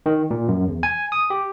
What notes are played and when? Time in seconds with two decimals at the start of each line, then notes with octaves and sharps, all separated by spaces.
0.06 D#3
0.31 A#2
0.48 F#2
0.68 E2
0.83 G#5
1.12 D#6
1.30 G4